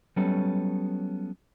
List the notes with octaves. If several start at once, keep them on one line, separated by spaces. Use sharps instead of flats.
F#3 G3 B3 C#4 A4